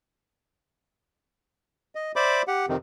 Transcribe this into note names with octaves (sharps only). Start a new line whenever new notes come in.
D#5
C5 D5 E5 B5 D6
G4 F#5
F2 C3 D#3